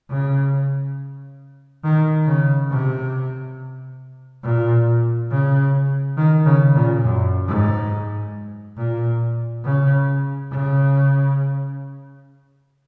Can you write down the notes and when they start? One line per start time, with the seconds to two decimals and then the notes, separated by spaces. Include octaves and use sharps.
0.10 C#3
1.84 D#3
2.27 C#3
2.70 C3
4.44 A#2
5.31 C#3
6.17 D#3
6.46 C#3
6.75 A#2
7.04 F#2
7.48 G#2
8.77 A#2
9.64 C#3
10.51 C#3